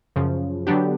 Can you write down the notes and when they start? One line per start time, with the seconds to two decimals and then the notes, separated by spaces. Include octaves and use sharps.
0.16 F#2 C#3 F3
0.67 D3 F#3 B3 D4 G4